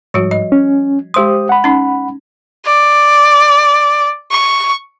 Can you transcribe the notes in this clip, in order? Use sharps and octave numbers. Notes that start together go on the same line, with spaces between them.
G#2 F3 G3 F#4
D#5
C#4
G#3 G4 C5 C6 D#6
F#5 B5
C#4 D#4
D5
C#6